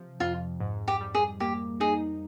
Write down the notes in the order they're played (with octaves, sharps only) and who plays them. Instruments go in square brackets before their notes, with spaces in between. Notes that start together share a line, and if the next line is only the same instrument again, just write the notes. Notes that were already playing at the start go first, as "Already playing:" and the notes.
Already playing: [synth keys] C3 F3
[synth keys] F2 [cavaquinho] F4
[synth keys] G#2
[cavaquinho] G4
[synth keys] G3
[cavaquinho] G#4
[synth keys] A#3 [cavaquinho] G4
[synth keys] D#4 [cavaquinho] G#4